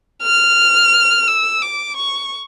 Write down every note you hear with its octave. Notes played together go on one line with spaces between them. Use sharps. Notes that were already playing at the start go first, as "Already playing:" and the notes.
F6
E6
D6
C#6